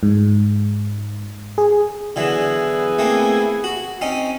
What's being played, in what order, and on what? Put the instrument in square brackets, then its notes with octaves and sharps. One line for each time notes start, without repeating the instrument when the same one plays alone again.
[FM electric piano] G#2
G#4
[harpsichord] D3 E3 F#3 [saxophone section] B3 E4 G#4
[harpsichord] A3 A#3 C4
F#4
C4 C#4 D#4